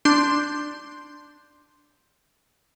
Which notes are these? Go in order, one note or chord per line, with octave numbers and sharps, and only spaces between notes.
D4 C6 G6